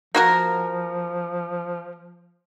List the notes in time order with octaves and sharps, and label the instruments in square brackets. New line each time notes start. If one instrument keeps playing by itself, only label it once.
[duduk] F3 [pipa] A#3 F#4 A#4